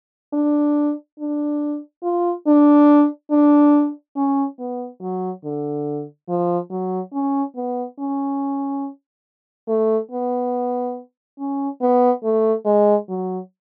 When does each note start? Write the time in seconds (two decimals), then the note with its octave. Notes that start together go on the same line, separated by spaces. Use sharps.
0.33 D4
1.19 D4
2.03 F4
2.47 D4
3.31 D4
4.16 C#4
4.59 B3
5.01 F#3
5.44 D3
6.29 F3
6.71 F#3
7.13 C#4
7.56 B3
7.99 C#4
9.68 A3
10.11 B3
11.39 C#4
11.81 B3
12.23 A3
12.66 G#3
13.09 F#3